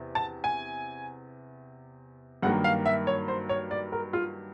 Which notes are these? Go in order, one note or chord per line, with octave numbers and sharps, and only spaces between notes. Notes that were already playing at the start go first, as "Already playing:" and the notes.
Already playing: E2 C3
A5
G#5
G2 D#3 F#3 A#3 F#5
F5
E5
C#5
C5
C#5
D5
A#4
F4